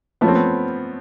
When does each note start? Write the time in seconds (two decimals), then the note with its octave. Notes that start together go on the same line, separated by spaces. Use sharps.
0.21 F3 A3 B3 C#4
0.28 C4
0.35 B3